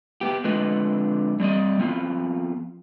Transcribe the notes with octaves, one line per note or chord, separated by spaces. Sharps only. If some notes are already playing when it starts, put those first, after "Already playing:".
B3 G4
F2 D3 G#3 F4 B4 D#5
G3 C4 D5 D#5
F3 B3 C4 F4